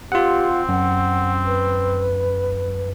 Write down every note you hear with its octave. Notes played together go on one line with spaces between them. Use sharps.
C4 F4 G4 F#5
F#2 F#5
B4